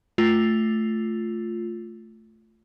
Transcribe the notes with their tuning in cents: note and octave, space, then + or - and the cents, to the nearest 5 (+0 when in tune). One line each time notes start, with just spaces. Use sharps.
A3 +0 F4 +0